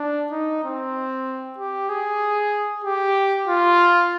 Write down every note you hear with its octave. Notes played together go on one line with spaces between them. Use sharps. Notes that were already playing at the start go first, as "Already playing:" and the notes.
Already playing: D4
D#4
C4
G4
G#4
G4
F4